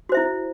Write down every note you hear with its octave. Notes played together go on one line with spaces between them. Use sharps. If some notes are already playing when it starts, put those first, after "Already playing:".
E4 F#4 C5 E5